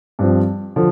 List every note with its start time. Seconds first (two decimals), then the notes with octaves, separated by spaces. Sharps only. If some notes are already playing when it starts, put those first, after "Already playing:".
0.19 G2 F3 C4
0.76 D3 F3